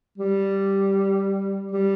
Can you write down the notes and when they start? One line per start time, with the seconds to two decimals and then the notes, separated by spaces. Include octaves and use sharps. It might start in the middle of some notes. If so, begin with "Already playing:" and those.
0.18 G3
1.72 G3